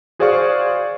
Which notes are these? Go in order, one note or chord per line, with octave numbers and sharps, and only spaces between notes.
F#4 G#4 C5 D5 F5 C#6